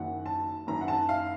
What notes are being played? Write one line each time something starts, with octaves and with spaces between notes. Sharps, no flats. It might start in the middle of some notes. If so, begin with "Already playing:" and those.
Already playing: F#1 F#2 D#3 F#5
A5
F#1 F#2 D#3 A#5
F#5
A5
F5